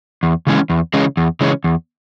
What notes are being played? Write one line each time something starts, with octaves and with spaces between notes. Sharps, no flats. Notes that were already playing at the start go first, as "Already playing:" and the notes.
E2
C#3 E3 G#3 C#4
E2
C#3 E3 G#3 C#4
E2
C#3 E3 G#3 C#4
E2